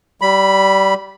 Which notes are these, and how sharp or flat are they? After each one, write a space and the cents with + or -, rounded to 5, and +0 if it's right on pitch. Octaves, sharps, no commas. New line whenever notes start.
G3 -20 B5 +0